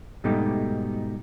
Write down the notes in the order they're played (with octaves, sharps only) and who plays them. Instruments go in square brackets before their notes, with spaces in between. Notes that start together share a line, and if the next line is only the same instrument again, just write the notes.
[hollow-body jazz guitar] G#2 B2 G3 A3 D#4 G4